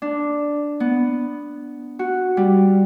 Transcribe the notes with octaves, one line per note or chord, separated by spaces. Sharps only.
D4
B3
F#4
G3